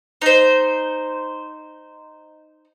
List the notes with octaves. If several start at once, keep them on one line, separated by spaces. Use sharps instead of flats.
D#4 C5